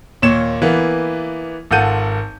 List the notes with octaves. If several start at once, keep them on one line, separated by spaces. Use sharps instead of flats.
D#2 A#2 C#5 E7
E3 A#3 B3
G#1 F4 A4 F#5 G6 D#7